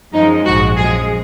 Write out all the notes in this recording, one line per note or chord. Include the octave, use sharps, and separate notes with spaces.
F#2 F3 G#3 D#4
A#1 G#2 F3 G#3 F#4
F#2 F3 G#3 G#4